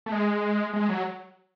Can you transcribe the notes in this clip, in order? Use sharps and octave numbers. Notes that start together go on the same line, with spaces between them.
A3
G#3
G#3
F#3